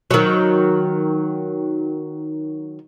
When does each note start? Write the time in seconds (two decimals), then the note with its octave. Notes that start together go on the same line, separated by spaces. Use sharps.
0.11 D#3 F#3